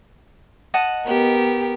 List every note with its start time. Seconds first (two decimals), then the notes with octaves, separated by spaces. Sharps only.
0.74 D#5 F#5 A5
1.04 B3 G4 A#4